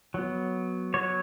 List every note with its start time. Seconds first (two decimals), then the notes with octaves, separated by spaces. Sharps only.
0.14 F#3 B3
0.94 F#3 B3 C#5